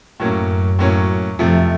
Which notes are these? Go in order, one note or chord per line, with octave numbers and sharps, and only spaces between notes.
F#2 A2 F#3 A#3 C#4
A2 F#3 A#3 C#4
F2 C3 F3 A3